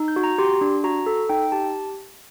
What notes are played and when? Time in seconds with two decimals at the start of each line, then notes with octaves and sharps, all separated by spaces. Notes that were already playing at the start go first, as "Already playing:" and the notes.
Already playing: D#4
0.08 G6
0.16 F#4
0.24 A#5
0.38 G4 C6
0.61 D4
0.84 F#4 A#5
1.06 A4
1.29 D#4 G5
1.52 G4 A5